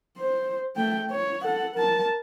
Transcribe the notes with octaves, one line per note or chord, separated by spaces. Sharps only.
C5
A3 G5
C#5
A4 F#5
A#4 A5